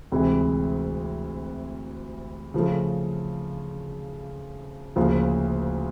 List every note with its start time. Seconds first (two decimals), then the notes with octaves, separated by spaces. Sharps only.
0.12 D2 C3 E3 G#3 C4
2.54 C#3 F3 A3
4.96 D2 C#3 F3 A#3